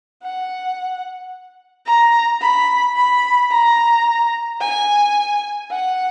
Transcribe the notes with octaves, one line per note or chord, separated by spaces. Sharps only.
F#5
A#5
B5
B5
A#5
G#5
F#5